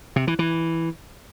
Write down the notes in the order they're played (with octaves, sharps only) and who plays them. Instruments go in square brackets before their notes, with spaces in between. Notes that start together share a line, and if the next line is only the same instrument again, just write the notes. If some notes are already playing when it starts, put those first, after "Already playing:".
[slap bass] C3
E3
E3